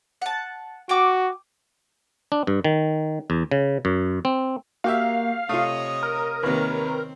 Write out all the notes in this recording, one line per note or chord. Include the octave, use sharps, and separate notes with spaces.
F#5 A5
F#4 G5 C#6 D6
D4
G2
D#3
E2
C#3
F#2
C4
A#3 F#4 G4 E5 F5
C3 A3 F4 C#5 D#5 D#6
A#4
D#2 C3 D#3 A#3 B4 C#5
C4